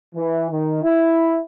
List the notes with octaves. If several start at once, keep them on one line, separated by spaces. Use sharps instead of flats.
E3
D#3
E4